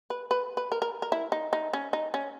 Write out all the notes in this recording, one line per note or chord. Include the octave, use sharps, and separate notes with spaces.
B4
B4
B4
A#4
A#4
A#4
E4
D#4
D#4
C#4
D#4
C#4